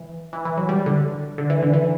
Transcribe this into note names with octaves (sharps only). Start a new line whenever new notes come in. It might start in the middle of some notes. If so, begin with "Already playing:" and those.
Already playing: E3
E3
E3
F#3
G3
D3
D3
E3
D3
E3